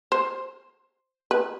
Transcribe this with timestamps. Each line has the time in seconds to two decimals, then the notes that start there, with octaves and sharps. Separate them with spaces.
0.12 C5
1.31 B4